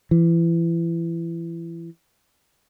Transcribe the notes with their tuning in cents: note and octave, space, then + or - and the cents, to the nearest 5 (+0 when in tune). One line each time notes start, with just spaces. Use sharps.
E3 +25